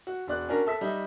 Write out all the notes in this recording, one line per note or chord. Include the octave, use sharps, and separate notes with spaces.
F#4
E1 F#4 D5 F#6
C#4 D4 F#4 A#4
A4 E5 E6 B6
G3 D#4 E5